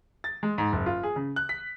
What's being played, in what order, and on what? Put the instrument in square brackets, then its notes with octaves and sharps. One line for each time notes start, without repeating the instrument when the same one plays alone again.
[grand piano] A6
G#3
G#2
F#1
F4
G#4
C#3
F#6
B6